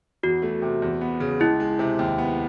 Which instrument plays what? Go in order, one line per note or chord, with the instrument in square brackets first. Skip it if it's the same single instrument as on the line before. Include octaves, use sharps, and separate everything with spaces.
[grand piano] E2 [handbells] F#4
[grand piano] A3
C3
E2
B3
C#3
[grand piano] C#2 [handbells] E4
[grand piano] G#3
C3
D#2
B3